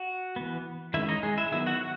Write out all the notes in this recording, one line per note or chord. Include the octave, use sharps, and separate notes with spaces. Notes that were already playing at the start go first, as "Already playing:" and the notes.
Already playing: F#4 F#5
E3 B3
D#3 G#3 C#4 E4 E5
D#4 D#5
G#3 G#4
E4 E5
D#3 F#3 B3 E4 E5
F#4 F#5
F#4 F#5